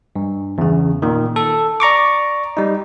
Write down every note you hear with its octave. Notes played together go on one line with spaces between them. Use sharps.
G2
E2 C#3
A#2 D#3
A4
D5 A#5 C#6 D6
G3 D#4